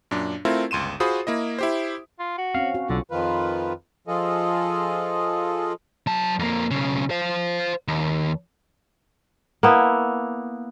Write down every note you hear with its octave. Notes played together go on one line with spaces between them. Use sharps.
F#2 A#2 D4
A3 C4 E4 F4 A#4
G1 C#2 C6 D#7 E7
F4 F#4 G#4 C5 B5 D#6
A#3 E4 D#5
E4 G4 C5
F4
F#4
C4 C#4 F5
F#4
B1 D3 F4
F2 D#3 F3 F4 B4
F3 F4 G#4 A4 D#5
F#3 A5
F2 A#3
B1 C#3
C5 F5
D#2
A#3 B3 E4